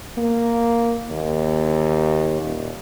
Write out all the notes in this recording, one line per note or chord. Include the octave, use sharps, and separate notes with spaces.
A#3
D#2
D#1